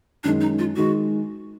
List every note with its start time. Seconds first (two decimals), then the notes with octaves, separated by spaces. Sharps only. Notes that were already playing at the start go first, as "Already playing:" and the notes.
0.24 F#2 D#3 G#3 D4
0.41 D#4
0.59 F4
0.76 D#3 G#3 F#4